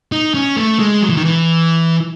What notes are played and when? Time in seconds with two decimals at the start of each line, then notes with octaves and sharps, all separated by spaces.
0.12 D#4
0.34 C#4
0.56 A3
0.79 G#3
1.02 F#3
1.09 E3
1.17 D#3
1.24 E3